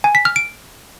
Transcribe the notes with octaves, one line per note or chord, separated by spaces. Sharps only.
G#5
B6
F6
D7